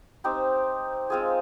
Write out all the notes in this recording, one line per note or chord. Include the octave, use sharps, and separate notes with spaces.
C4 D#4 G4 C5
G#3 C4 F4 G#4